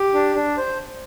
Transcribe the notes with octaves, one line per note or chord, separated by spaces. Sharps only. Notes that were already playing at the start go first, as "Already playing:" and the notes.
Already playing: G4
D4
D4
C5